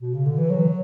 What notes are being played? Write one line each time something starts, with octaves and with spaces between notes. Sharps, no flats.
B2
C#3
D3
E3
F#3